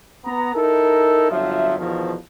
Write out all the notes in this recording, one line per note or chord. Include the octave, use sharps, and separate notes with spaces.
B3 A#5
D#4 E4 A4 A#4
G1 F2 F3 F#3 E5
E2 B2 D#3 F3